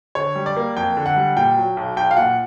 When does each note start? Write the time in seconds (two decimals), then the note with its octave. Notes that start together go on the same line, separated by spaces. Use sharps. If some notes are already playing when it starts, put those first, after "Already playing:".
0.15 D3 C#5
0.35 G3
0.46 D5
0.57 A#3
0.76 F2 G5
0.97 D3
1.06 F#5
1.16 G3
1.37 A#2 G5
1.57 F#3
1.77 B1
1.96 B1 G5
2.11 F5
2.17 A#2 F#5